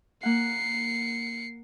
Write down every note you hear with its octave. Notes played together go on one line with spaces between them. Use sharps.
A#3 F#5 C7 C#7